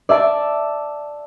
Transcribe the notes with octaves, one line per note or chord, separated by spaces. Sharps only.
D5 E5 A5 D7